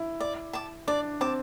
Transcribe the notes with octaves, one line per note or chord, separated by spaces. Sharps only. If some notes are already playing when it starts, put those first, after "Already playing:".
Already playing: E4
D5
A5 D6
D4 D5
C4 A5 D6